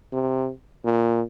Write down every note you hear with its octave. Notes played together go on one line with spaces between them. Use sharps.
C3
A#2